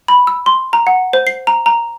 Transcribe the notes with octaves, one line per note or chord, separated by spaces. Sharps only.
B5
E6
C6
A#5
F#5
C5
C7
A#5
A#5